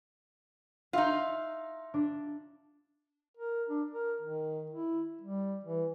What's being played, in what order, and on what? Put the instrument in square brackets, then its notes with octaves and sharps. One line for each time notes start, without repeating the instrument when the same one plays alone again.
[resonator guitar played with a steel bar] D#4 F4 [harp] E5
[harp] D4
[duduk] A#4
D4
A#4
D#3
E4
G3
E3